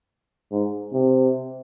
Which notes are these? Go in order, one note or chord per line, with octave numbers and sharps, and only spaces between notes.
G#2
C3